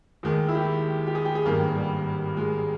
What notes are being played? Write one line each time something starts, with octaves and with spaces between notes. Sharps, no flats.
D#2 D#3 G#3
E4
G4
G4
G#4
G4
G#4
G#1 G2 D#3 A#3
G3
G#3